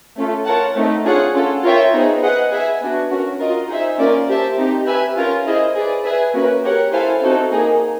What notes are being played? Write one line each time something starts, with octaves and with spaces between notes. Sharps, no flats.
A3 C#4 F4 A4
F4 A#4 C#5 F#5 A5
A3 C4 D#4
D4 F4 G#4 C#5 F#5
C#4 F4 A4
F4 A#4 C#5 E5 G5
B3 D#4 G#4 C5
G#4 B4 D#5 F#5
G#4 B4 E5 G#5
B3 D4 F#4
C#4 F#4 A#4
F4 A#4 D#5
D#4 G#4 C5 E5
A#3 C#4 F4 A#4 D5
G4 C5 E5 A5
C4 D#4 G4
G4 B4 E5 G#5
C#4 F4 A#4
E4 G#4 C5 D#5
G#4 B4 D5
G#4 B4 E5 G#5
A#3 C#4 F#4 B4
G4 A#4 C#5 F#5
E4 A4 C5 F5 G#5
C4 D#4 F#4 A4
A#3 D#4 G#4